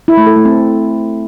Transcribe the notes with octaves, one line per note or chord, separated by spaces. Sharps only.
E4
A3
A4
A3
C4